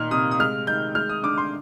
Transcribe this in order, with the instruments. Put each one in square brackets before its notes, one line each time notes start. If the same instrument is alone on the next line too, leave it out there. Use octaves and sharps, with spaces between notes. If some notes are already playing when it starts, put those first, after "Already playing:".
Already playing: [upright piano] A#2 D#3 F6
C3 D#6
D#6
G#3 F6
D#3 G6
G#3 F6
D#6
D3 D6
C6